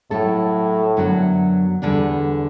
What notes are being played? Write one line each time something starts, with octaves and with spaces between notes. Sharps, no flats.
A2 F#3 A3 E4 A4
F#2 D3 F#3 B3 F#4
E2 D3 G3 D4